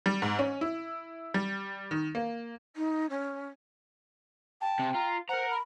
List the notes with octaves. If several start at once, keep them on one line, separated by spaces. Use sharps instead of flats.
G3
G#2
C#4
E4
G3
D#3
A#3
D#4
C#4
G5 A5
C3
F4 A#5
A#4 C5 F#5 A#5
B5